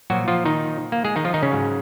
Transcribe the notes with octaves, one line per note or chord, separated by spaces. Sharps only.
A#2 F3 F#3 F#4
F3 F4
D#3 D#4
A#3
G#3 G#4
D#3 D#4
F3 F4
D#3 D#4
C#3 C#4
G#2 F#3